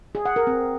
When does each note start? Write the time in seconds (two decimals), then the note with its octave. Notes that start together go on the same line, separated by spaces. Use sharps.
0.15 G#4
0.25 F#5
0.36 A#4
0.47 C4